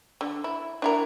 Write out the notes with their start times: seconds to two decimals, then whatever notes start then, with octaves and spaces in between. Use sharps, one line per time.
0.21 D3
0.44 E4
0.82 D4 E4 A#4